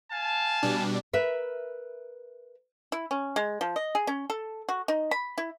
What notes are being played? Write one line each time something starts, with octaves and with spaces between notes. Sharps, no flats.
F5 G#5 A5
B2 G3 D4
A#4 B4 E5
E4
C#4
G#3
F3
D#5
G#4
C#4
A4
F#4
D#4
B5
E4